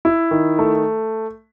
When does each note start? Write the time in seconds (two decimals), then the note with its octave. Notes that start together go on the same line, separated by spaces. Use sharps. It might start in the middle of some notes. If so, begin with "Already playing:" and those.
0.05 E4
0.31 D#3
0.59 A3